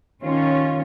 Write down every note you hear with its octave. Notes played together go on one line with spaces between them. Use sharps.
D#3 C#4 F4